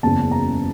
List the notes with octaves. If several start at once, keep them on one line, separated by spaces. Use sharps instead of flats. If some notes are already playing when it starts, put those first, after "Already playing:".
F#1 E2 C#3 A5
A#5